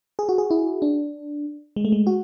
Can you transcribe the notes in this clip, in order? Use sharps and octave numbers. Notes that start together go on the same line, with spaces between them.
G#4
F#4
G#4
E4
D4
G#3
A3
G#3
F#4